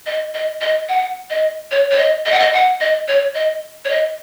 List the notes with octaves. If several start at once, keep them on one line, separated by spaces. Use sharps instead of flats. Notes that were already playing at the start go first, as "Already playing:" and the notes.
D#5
D#5
D#5
F#5
D#5
C#5
C#5
D#5
D#5
F#5
D#5
F#5
D#5
C#5
D#5
C#5
D#5